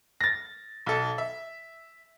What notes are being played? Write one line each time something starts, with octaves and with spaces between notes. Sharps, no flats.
A6 A#6
B1 A4
E5